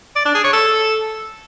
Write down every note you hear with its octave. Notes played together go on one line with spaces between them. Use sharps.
D5
D4
G#4
C#5
A4